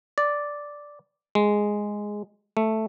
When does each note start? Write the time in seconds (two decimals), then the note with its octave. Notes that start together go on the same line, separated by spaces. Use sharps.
0.18 D5
1.35 G#3
2.57 A3